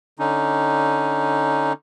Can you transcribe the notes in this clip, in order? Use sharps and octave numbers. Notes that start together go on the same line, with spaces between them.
D3 C#4 D#4